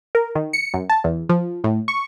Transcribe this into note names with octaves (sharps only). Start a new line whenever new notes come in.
A#4
D#3
C#7
F#2
A5
E2
F3
A2
C#6